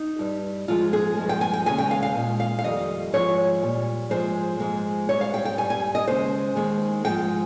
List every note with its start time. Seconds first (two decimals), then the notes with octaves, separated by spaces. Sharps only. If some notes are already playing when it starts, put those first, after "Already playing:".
Already playing: D#4
0.19 G2 G3
0.68 G#2 F3 G#3 F4
0.93 G#4
1.17 G2 F3 G#3
1.29 G5
1.41 G#5
1.53 G5
1.66 D#2 C#3 G#3 G#5
1.78 G5
1.91 F5
2.03 F5
2.15 A#2 G#3
2.40 F5
2.59 F5
2.64 F2 D#3 G3 D#5
3.13 G#2 F3 G#3 C#5
3.62 A#2 G3
4.10 G#2 F3 G#3 C5
4.60 G#2 F3 G#3
5.09 G#2 G3 C#5
5.21 F5
5.34 G5
5.45 G5
5.58 G2 G3 G#5
5.70 G#5
5.95 D#5
6.07 D#2 C#3 G#3 C5
6.56 D#2 D#3 G#3
7.04 G#2 F3 G#3 G5